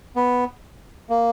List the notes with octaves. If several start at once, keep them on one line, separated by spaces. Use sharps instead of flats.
B3
A#3